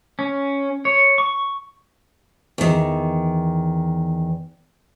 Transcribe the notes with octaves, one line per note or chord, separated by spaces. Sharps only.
C#4
C#5
C#6
E2 D#3